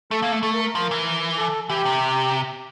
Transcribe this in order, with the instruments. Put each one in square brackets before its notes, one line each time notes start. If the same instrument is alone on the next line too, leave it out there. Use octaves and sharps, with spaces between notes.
[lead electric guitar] A3 [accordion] A4
[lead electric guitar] A#3
A3
[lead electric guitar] A3 [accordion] A4
[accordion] A#4
A#4
[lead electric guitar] F3
E3
[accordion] A4
[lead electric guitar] E3 [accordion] G4
[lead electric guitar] C3